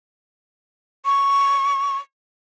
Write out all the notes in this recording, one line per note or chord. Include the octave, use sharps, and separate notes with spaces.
C#6